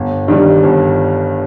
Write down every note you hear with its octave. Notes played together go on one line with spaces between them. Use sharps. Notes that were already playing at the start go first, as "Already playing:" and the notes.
Already playing: G1
G2 D#3 G3
G1